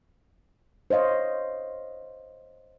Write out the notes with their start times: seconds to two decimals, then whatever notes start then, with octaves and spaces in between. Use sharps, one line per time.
0.90 C5 C#5 D#5 F5